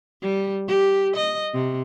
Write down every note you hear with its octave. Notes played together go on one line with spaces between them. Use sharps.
G3
G4
D#5
C3